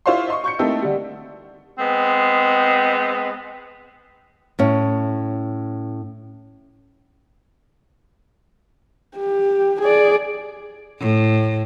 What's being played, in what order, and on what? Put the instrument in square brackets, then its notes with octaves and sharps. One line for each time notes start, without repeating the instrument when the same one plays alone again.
[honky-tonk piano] E4 F4 C5 C#5 F5 C6
D#5 C6 C#6
C#6 G6 C#7
A3 A#3 C4 D#4 E4 A4
D3 G3
[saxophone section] G#3 B3 C4
[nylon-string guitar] A2 C#4
[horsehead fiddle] G4
G#4 D5
[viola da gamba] A2